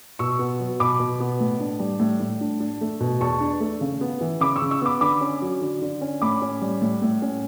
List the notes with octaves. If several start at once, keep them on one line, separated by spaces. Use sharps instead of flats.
B2 C#6 E6
B3
F#3
B2 B5 D6
B2
B3
A2
D4
G3
A2
A2
D4
D4
A3
B2
E2 A5 C#6
D4
A3
C#3
B3
E3
C#3 B5 D6
C#6 E6
C#3
C#6 E6
B3 B5 D6
D3 B5 D6
C#4
F#3
D3
D3
C#4
A2 B5 D6
C#4
G3
A2
A2
C#4